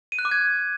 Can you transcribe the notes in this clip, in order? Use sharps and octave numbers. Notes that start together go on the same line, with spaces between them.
D#7
F#6
D6
G#6